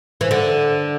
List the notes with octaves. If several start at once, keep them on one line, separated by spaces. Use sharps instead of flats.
E3
D3